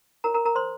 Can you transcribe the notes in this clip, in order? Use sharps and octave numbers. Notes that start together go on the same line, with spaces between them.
F4 A#4 C#5 A#5
A#4 A#5
A#4 A#5
C5 C6